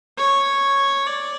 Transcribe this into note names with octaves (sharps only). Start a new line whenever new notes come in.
C#5
D5